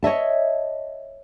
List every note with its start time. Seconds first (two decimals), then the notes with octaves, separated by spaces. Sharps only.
0.03 C#5 D#5 E5 A5